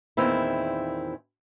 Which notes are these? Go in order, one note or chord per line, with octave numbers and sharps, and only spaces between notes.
E2 A#2 D#3 C4 E4